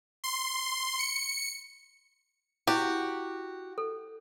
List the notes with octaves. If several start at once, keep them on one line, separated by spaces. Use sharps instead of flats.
C6
C#7
E4 F#4 G4
A4